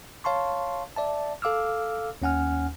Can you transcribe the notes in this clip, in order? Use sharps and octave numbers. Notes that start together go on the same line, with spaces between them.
C#5 F5 A5 C6 C#6
D5 E5 A5
A4 F5 D6 E6 F6
D#2 C#4 F#5 G#5 F6